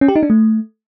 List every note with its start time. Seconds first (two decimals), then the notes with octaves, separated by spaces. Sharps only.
0.01 C#4
0.08 G4
0.16 D#4
0.23 D4
0.30 A3